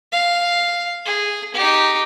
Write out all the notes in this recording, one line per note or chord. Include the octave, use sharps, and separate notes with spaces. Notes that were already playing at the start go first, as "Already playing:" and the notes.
F5
G#4
D#4 G4